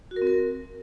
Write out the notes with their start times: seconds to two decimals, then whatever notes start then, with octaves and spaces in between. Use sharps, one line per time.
0.11 F#4
0.16 A#4
0.22 C4
0.27 A#4